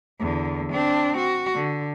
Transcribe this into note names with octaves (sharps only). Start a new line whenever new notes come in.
E2 D3
C4 D4
F#4
D3